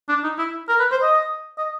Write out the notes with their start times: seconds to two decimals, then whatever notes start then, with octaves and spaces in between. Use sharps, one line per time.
0.09 D4
0.23 D#4
0.38 E4
0.69 A#4
0.79 B4
0.91 C5
1.02 D#5
1.58 D#5